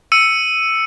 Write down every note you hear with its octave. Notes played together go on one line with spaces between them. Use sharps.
E6 C#7 D#7